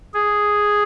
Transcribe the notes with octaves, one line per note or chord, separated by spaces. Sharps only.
G#4